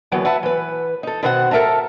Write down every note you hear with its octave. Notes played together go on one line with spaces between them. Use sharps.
D#2 D3 E3 F#3 B3
B4 E5 F#5 A5
E3 B4
D#4 A4
B2 D#3 C4 F#4 A4 F#5
A4 A#4 E5 A5 A#5